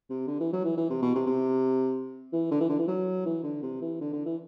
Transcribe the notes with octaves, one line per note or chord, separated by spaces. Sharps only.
C3
D3
E3
F#3
E3
E3
C3
B2
C3
C3
E3
D3
E3
D3
E3
F#3
E3
D3
C3
E3
D3
D3
E3